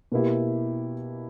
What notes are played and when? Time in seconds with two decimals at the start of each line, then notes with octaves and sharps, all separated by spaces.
0.12 B2 A#3 E4 G4